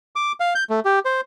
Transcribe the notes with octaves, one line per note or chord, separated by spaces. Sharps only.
D6
F5
G6
A3
G4
C5